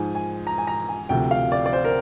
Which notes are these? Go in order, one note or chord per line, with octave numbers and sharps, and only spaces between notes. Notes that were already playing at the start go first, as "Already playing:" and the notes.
Already playing: G#2 F3 G#5
G#5
A#5
G#5
A#5
G#5
D2 C3 F3 G5
F5
D5
D5
C5
A#4